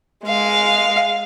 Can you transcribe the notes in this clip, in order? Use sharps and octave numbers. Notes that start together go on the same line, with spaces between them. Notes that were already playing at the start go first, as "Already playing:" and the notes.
G#3 F5